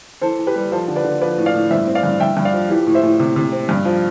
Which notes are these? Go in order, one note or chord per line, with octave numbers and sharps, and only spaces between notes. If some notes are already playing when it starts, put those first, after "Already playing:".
E3 A4 C5
E3
G4 B4
G3
F3 A4 C5
D3
B4 D5
D3
F3 B4 D5
A2
D5 F5
A2
G2 C5 E5
C4
D5 F5
G2
G2 E5 G5
G2
D5 F5
F3
E3 G4
A2
C5 E5
A2
C3
C3
C4
G2
F3